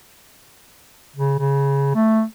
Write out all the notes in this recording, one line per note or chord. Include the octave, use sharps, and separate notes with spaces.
C#3
C#3
A3